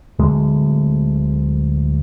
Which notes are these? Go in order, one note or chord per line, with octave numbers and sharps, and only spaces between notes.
D1 D2 G#3